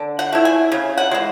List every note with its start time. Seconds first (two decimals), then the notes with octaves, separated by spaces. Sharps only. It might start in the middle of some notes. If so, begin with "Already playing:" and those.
Already playing: D3
0.19 F#5
0.32 A3 E4
0.45 G#5
0.72 C#3
0.98 F#5
1.11 E3 G#3